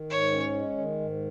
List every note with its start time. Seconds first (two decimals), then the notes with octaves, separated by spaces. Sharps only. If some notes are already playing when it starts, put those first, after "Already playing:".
Already playing: D#3
0.10 G#2 C#5
0.32 C#4
0.55 G#3
0.78 D#3
1.00 G#2